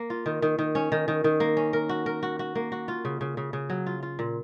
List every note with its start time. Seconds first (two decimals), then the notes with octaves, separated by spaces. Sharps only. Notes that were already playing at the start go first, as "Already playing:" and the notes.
Already playing: A#3
0.10 F4
0.26 D#3
0.42 D#3
0.59 D#3
0.75 C#4
0.92 D#3
1.08 D#3
1.24 D#3
1.40 A#3
1.57 C#4
1.73 A#4
1.89 F#4
2.06 A#4
2.23 F#4
2.39 F#4
2.55 A#3
2.72 F#4
2.88 F4
3.05 C#3
3.21 C#3
3.37 C#3
3.53 C#3
3.70 F#3
3.86 F4
4.03 F4
4.19 A#2